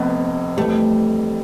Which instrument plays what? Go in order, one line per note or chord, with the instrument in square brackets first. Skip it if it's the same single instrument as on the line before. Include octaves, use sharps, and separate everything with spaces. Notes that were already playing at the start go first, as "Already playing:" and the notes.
Already playing: [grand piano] F1 F2 A3 [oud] B3
[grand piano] F2 E3 G3 [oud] A3